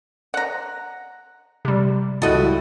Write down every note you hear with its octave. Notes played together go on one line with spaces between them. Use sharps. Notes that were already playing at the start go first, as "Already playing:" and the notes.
F#5 A#5
C3 G3
C#2 G3 E4 F#4 A4 D#5 F#5